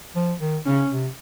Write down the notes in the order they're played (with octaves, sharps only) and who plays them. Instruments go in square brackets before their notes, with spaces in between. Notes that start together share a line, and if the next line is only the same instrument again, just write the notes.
[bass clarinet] F3
D#3
[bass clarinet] C#3 [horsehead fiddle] C#4
[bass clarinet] C3